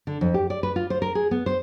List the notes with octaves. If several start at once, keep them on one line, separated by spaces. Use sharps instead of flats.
D3
F2
G4
D5
B4
F4
C5
A#4
G#4
B3
C5